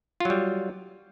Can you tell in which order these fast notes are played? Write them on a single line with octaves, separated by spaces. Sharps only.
F4 F#3 G3